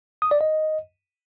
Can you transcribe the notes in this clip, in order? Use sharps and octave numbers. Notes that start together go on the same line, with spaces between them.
D#6
D5
D#5